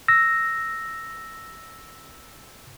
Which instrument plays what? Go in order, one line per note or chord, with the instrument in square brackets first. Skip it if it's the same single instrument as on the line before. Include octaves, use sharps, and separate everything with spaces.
[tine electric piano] E6 A#6